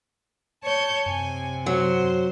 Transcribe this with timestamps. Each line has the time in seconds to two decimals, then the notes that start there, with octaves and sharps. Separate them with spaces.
0.64 C#5 A5 G6
1.06 F#2 C3 G#5
1.66 F#3 C5